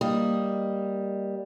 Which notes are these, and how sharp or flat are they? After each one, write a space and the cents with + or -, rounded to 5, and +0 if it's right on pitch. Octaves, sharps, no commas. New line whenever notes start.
G3 +0 A#3 +0 D#5 +0